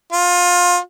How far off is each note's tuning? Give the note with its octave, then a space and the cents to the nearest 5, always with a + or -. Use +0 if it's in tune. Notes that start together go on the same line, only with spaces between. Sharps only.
F4 +25